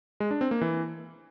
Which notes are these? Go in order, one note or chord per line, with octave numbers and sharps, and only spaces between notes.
G#3
D4
C4
A#3
E3